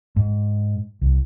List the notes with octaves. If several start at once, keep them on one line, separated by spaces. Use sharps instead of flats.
G#2
C2